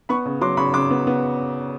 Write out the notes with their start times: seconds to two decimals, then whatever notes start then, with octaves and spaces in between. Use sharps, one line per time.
0.09 B3 B5 C#6
0.25 C#3
0.41 F#3 C6 D6
0.57 C#3 B5 C#6
0.73 C#3 C6 D6
0.91 B3
1.07 B3